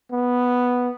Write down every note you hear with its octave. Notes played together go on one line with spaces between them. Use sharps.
B3